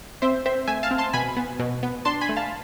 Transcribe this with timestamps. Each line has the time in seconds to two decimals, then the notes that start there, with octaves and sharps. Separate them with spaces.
0.22 C4 C5 E5
0.46 C4 C5 E5
0.67 A3 E5 G#5
0.83 F5 A5
0.91 C4
0.98 A5 C6
1.13 B2 G#5 B5
1.37 B3
1.59 B2
1.83 B3
2.05 D4 A5 C6
2.21 G#5 B5
2.29 A3
2.36 F5 A5